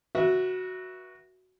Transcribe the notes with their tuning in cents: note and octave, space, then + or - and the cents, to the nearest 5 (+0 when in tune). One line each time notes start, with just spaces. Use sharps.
F#4 +0 B4 -35 E5 +0